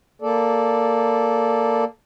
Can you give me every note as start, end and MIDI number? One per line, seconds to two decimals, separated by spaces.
0.22 1.85 58
0.22 1.85 69
0.22 1.85 74